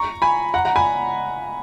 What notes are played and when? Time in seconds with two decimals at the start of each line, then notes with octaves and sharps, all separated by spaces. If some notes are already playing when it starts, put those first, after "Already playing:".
Already playing: A#5 C#6
0.22 G#5 B5
0.54 F#5 A#5
0.65 F#5 A#5
0.76 G#5 B5